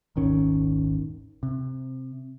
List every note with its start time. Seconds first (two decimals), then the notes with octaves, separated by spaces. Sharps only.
0.16 D#1 G#1 D#3 C#4
1.43 C3